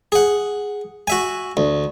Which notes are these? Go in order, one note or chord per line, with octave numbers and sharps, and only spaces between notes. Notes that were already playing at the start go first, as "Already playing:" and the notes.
G#4 F#5
F#4 E5 G#5
D2